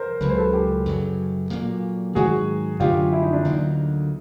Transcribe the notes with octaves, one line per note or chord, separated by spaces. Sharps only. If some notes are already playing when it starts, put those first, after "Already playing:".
Already playing: A#4 C5
C#2 C#3 F#3 B4
C5
A4 B4
G4 A4
F#2 C#3 F#3
A#2 F#3 A#3
G#2 D#3 F#3 F#4 G#4
F#2 D3 F#3 A3 F4 G4
E4
D#4
D4
D2 D3 F#3 A#3 D#4